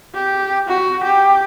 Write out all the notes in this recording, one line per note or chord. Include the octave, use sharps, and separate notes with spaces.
G4
F#4
G4